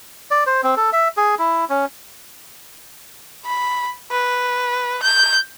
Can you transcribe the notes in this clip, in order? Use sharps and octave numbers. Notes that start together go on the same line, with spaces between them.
D5
C5
C4
A4
E5
G#4
E4
C#4
B5
B4
G6